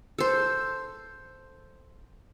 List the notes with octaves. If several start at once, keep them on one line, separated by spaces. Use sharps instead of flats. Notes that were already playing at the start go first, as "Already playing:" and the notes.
A4 C5